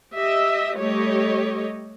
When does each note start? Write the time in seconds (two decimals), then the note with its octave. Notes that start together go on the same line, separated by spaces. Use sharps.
0.14 G4 D#5 E5
0.76 G3 A3 G4 C#5 D#5